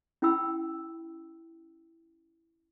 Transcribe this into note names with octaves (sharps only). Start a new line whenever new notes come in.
C#4 E4 G5 B5 E6